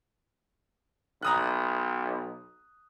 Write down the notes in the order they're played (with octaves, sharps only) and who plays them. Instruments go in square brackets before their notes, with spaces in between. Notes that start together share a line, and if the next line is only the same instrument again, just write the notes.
[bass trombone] B1 [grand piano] A#5 D#6 F#6